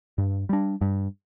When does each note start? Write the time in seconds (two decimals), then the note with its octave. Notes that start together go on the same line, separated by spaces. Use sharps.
0.18 G2
0.49 G3 D4
0.81 G2